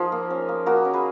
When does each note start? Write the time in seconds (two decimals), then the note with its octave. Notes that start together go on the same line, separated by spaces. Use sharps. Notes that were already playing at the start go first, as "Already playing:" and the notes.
Already playing: F3 D#4 G#4 A#4
0.12 A#3
0.30 C#4
0.49 A#3
0.66 A#3 F#4 A#4
0.85 C#4
0.93 G#4 B4